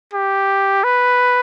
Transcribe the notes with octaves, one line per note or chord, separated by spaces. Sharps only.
G4
B4